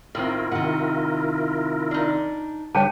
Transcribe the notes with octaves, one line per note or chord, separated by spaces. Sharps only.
A2 D#3 C4 E4 F4 A#4
C3 D#3 F#5
D4 D#4
D3 G3 G4 B4 C#5 G5 A5